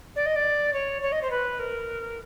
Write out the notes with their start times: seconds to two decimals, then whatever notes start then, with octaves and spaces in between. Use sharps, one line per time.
0.15 D5
0.26 D#5
0.35 D5
0.73 C#5
1.02 C#5
1.12 D#5
1.22 C5
1.30 B4
1.59 A#4